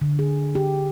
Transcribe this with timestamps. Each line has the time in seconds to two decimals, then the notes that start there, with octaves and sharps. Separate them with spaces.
0.01 D3
0.19 G#4
0.55 G4